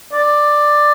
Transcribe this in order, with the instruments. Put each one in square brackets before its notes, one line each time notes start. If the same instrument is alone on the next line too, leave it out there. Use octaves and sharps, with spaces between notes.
[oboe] D5